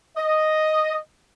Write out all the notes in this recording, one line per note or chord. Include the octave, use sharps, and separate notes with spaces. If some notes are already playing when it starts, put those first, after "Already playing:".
D#5